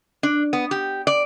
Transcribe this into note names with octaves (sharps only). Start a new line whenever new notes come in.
D4
B3
G4
D5